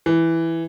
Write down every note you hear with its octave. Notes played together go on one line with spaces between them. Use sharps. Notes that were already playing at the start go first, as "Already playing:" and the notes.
E3